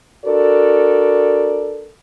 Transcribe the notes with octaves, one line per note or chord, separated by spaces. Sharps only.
D4 F#4 A4 A#4 D5